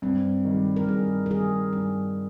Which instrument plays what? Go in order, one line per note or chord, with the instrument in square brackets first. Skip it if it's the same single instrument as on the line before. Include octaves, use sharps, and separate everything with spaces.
[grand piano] G2 [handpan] C4
[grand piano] D#3
G3
[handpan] A#4
[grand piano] G2 [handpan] G#4
[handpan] A#4
[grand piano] D#3 G3 [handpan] G#4
[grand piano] G2 [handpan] G#4